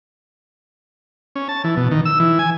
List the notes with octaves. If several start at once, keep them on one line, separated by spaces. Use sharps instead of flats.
C#4
A5
E3
B2
D#3
E6
E3
G#5